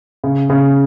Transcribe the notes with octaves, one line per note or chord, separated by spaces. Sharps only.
C#3
C#3